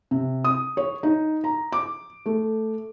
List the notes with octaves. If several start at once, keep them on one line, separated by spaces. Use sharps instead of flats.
C3
D#6
C#5
D#4
A#5
D6
A3